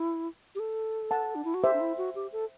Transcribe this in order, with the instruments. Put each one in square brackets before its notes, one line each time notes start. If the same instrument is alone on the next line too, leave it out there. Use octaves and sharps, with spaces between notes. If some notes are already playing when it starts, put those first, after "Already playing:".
Already playing: [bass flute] E4
G4
A4
[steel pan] F#5 A5
[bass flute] D4
E4
F#4
[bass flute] G4 [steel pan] C5 E5
[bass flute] D4
E4
F#4
G4
A4